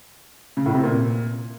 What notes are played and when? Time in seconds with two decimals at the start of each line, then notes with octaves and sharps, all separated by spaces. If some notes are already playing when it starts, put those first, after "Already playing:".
0.57 C#3
0.66 A2
0.75 C3
0.84 A#2